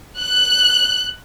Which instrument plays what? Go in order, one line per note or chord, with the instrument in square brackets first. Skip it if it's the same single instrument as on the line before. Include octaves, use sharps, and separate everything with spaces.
[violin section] F#6